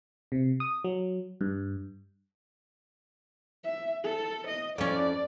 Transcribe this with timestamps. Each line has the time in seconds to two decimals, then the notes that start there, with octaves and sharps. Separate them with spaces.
0.32 C3
0.60 D#6
0.84 F#3
1.41 G2
3.64 E5
4.04 A4
4.47 D#5
4.78 F2 C#4 D5